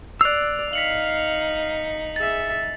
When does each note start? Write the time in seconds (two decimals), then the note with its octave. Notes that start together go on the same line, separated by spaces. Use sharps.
0.21 D5 E6 F#6 C7 F7
0.73 D#4 F5 B6 C#7 F#7
2.16 G#4 E5 A6